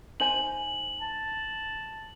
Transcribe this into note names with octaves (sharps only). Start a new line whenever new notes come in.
D#4 C5 G#5 F#7
A5